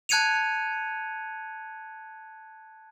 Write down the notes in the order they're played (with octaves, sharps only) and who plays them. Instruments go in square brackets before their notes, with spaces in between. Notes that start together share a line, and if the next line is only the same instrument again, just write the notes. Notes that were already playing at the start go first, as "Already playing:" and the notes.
[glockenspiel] A5 F#6 G#6 C#7 D#7 F7